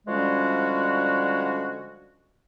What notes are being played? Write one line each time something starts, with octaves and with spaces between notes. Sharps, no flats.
D3 F3 G3 G#3 C#4 F#4